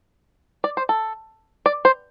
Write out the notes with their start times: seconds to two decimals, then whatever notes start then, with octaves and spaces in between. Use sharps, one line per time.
0.64 D5
0.77 C5
0.89 A4
1.66 D5
1.85 C5